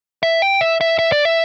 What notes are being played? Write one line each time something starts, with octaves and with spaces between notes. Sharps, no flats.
E5
G5
E5
E5
E5
D5
E5